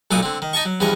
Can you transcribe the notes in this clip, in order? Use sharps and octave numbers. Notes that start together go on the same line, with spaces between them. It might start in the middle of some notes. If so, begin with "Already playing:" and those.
B1 A#2 F#3 A3 D6 D#6
D3 C4
D#3
D#4 D#5 A5 C#6
F#3
E2 G2 F3 C#5 D#5